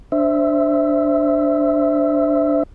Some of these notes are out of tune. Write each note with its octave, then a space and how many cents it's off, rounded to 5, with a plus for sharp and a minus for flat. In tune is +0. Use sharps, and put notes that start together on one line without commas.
D4 +0 C5 +0 E5 +0